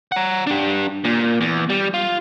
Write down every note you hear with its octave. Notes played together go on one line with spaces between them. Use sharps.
F#5 A#5
D4 G4
A#2
E2
G3
F4